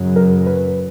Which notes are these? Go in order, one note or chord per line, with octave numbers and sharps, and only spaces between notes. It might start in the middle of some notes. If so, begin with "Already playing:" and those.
Already playing: F#2 C#3 F#3
A#4
B4